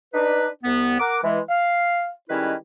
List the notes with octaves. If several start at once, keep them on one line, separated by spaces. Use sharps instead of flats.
D4 D#4 B4
C2 B3
A#4 F#5 D6
E3 G#3
F5
D#3 G3 G#3 C#4 E4 B4